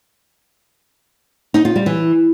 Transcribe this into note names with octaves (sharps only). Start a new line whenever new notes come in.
D#4
F4
G3
E3